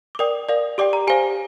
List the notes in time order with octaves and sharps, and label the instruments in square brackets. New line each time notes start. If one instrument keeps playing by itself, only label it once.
[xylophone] D6
A#4 D5 G5 D#6
A#4 D5 F5
G4 D5 G5 D6
A#5
G4 C5 F5 G#5